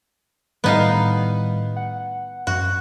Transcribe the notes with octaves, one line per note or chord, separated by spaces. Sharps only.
A2 D#3 G3 B3 D#4 F5
F#5
F#2 F#4